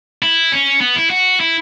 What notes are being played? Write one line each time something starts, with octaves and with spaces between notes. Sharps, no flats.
E4
C#4
B3
E4
F#4
E4